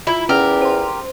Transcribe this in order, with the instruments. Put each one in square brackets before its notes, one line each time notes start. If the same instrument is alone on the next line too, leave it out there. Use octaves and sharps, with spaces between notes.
[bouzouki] E4 [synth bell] F4
[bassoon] E2 [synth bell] C#4 [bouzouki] G4 A#4
[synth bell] C5 C6